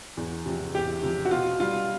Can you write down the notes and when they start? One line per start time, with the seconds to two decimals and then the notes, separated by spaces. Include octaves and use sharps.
0.17 E2
0.46 C3 F3
0.75 E2 G4
1.03 C3 F3
1.25 F#4
1.31 B2 F4
1.60 G3 F4